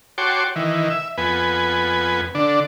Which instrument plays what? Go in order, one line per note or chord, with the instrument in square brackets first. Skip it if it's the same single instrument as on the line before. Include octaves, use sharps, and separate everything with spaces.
[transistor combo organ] F#4 C#5 G5 A5 C6 D6
D#3 E3
E5
F2 B3 B4 G#5
D3 D4